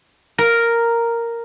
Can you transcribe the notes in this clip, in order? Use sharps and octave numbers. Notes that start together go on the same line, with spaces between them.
A#4